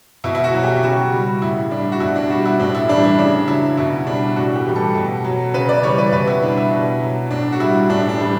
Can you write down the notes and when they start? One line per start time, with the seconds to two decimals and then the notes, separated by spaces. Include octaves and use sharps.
0.24 B2 E4
0.35 E4
0.44 F#4
0.54 F#3
0.64 G4
0.83 C#3 F#4
1.12 G3
1.42 A2 E4
1.71 G3 D4
1.92 F#4
2.00 B2 E4
2.16 D4
2.30 G3 F#4
2.46 E4
2.60 A2 D4
2.75 E4
2.89 E3 G3 D4
3.04 E4
3.19 C#3 D4
3.48 F#3 E4
3.77 B2 E4
4.07 G3 D4
4.36 A2 F#4
4.56 G4
4.65 E3 G3
4.76 A4
4.95 B2
5.25 F#3
5.54 C#3 B4
5.69 D5
5.83 E3 G3 C#5
5.98 B4
6.12 B2 B4
6.27 E4
6.42 G3 D4
6.57 E4
6.71 B2
7.01 F#3
7.30 A2 D4
7.52 F#4
7.60 G3 E4
7.90 A2 D4
8.09 D4
8.19 E3 G3